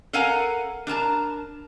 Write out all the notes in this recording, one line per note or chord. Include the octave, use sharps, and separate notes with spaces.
A4 A#4 F5 F#5 G#5 A#5
D4 A#4 A5 A#5